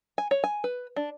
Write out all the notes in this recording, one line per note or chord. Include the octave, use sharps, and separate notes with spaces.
G#5
C#5
G#5
B4
D4